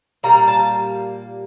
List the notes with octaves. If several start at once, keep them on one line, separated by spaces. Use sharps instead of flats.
A#2 G3 A#3 A#5
A5